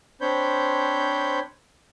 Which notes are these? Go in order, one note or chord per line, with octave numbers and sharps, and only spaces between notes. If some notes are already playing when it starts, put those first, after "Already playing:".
C4 D4 C5 C#5 B5 G6